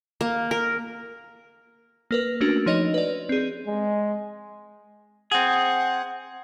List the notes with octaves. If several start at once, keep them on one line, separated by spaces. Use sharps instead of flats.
A#3
A#4
A#3 A#4 B4
A3 A#3 C#4 D4 F#4 A#4
F3 D#4 C#5 D#5 A#6 F7
B4 D5
C4 G#4
G#3
C4 G#4 F#5